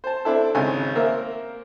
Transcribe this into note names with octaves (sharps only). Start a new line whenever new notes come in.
C5 A5
C4 D4 E4 A4
G#1 C#3 G#5
A#3 C4 A#4 E5